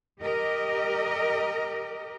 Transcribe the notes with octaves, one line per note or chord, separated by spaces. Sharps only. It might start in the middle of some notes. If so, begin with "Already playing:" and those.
G4 A#4 D#5